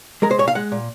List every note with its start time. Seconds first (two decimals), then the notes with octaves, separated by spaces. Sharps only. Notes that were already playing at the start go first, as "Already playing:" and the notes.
0.22 G#3 A#4
0.31 C5
0.38 A#2 C#5
0.48 F5
0.55 G#3 F#5
0.72 A#2